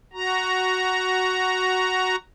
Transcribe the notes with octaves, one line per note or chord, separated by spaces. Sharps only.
F#4 A#5